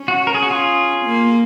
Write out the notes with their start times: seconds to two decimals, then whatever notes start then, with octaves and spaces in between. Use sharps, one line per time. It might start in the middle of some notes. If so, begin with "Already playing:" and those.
Already playing: C#4
0.08 F#4
0.27 A#4
0.35 G#4
0.43 F#4
0.50 F4 G#4
1.05 A#3